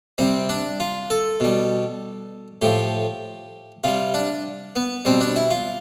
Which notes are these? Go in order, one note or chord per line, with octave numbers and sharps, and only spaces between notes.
C3 G3 C4
D4
F4
A4
B2 G3
A2 F3 G4
C3 G3 F4
D4
B3
B2 G3 C4
D4
E4
F4